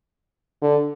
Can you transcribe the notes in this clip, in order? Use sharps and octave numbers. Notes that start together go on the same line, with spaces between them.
D3